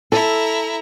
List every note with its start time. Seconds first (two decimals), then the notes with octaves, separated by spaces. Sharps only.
0.12 E4 A4 A#5